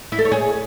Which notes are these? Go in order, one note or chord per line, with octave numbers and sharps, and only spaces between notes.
E4
A4
C#5
G#4